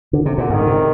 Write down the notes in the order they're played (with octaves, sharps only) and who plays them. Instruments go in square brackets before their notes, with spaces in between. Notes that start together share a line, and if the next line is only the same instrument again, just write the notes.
[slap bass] D3
C3
[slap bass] A#2 [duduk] D3
[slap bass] G#2 [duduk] D#3
[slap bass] C3